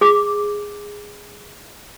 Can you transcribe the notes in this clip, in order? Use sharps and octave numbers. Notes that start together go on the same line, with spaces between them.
G#4 D6